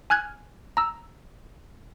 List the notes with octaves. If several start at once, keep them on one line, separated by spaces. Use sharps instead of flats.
G#5 F6 F#6 G#6
A#5 E6